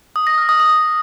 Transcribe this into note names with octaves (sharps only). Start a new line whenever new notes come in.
D#6
A#6
F6
D#6
D#6